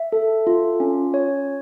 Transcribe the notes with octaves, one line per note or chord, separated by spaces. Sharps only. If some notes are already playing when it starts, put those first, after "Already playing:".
Already playing: E5
A4
F4
C#4
C#5